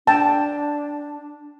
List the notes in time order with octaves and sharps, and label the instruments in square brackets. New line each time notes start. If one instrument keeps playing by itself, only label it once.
[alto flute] D4 [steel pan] G5 A5